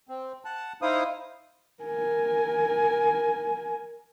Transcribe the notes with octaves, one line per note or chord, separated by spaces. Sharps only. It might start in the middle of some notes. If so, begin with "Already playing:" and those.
C4
F#5 A5
D#4 E4 C5 F5 D#6
A#4 G#5